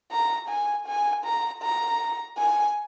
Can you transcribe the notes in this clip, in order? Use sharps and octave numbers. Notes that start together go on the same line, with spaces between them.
A#5
G#5
G#5
A#5
A#5
G#5